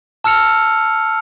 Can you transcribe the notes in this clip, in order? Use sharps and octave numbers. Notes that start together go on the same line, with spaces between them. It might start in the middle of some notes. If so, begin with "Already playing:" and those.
A5 E6 F6 C#7 F7